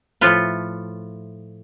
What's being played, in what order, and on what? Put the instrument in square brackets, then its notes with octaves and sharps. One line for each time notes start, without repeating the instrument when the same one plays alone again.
[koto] A2 F3 A3 F4 B4